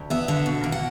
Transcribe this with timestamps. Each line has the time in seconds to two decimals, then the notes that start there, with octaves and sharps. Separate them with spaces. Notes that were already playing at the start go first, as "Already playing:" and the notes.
Already playing: D2
0.10 B3 E5
0.28 D3 E5
0.46 B2
0.64 A#3
0.72 F#5